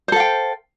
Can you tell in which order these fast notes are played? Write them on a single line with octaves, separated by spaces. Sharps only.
C5 A4 F5 G5